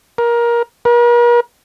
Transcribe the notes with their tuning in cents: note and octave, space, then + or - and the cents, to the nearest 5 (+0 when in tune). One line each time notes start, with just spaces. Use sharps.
A#4 +20
A#4 +45